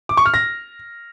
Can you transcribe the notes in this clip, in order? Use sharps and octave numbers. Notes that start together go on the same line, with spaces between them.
D6
C#6
F6
A#6